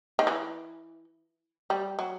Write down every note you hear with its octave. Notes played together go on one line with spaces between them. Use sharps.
D#3
E3
G3
F#3